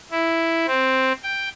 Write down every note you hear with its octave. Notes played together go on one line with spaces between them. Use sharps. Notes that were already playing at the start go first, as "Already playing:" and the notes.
E4
C4
G5